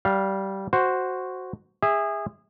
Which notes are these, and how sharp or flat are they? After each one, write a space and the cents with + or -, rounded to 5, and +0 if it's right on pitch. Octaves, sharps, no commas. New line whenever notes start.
G3 -15 F5 +0
F#4 +0 C5 +0
G#4 -25 E5 -10